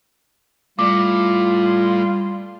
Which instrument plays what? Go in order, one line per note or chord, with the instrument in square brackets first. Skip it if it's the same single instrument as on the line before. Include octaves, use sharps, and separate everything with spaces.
[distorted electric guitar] A2 [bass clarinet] G3 [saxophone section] F4 [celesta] D6